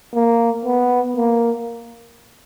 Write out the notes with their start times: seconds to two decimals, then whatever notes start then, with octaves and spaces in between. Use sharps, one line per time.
0.14 A#3
0.65 B3
1.17 A#3